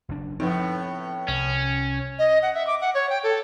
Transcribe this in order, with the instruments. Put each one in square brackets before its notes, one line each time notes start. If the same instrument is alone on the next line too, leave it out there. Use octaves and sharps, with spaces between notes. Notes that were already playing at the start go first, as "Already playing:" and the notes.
[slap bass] F#1 F#2 D4
[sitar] A2 B3 [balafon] F3 D#4 [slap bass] C4
[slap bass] C2 [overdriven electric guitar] C#4
[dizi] D#5
F#5
E5
D6
F#5
C#5
G5
A4